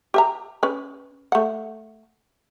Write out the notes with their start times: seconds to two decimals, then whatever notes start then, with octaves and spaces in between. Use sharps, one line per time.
0.14 G4 E5 A#5
0.63 C#4 B4
1.32 A3 F#5